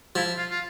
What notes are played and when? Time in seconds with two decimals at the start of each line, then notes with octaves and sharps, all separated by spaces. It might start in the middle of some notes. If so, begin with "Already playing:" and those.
0.15 F3 E4
0.38 F4
0.50 F4